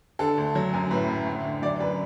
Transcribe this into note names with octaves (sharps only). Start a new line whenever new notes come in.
D3 A4
D2
F#3
F#2
A2 B4
A2
D2
D3
F#3 D5
F#2 B4